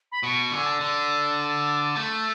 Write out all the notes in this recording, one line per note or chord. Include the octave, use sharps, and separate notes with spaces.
B5
B2 C#6
D3 G#5
A5
D3
A3